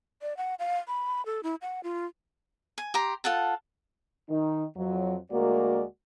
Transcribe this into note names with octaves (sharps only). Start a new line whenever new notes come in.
D5
F#5
F5
B5
A4
E4
F#5
F4
G#5
G4 A#5 C6
F4 A4 F#5 A5
D#3 D#4
F2 F#3
D2 G#3 A#3 F#4 A#4 D5